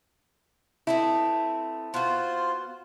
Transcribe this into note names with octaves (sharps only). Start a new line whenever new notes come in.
A3 B3 C4 E4
B3 F4 F#4 C5